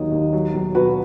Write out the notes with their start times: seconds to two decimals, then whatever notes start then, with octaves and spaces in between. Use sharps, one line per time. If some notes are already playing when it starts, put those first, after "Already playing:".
Already playing: D#2 D#3 F#3 D#5
0.11 D#2
0.33 F#3
0.54 B1
0.75 B2 F#4 B4